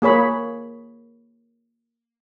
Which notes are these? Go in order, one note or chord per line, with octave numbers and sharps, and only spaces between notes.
A#3 G#4 C#5 B5